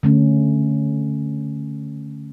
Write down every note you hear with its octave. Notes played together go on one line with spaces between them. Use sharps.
D3 A3 C#4